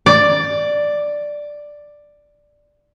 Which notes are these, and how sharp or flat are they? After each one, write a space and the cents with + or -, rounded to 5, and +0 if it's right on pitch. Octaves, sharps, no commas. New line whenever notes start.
D5 +5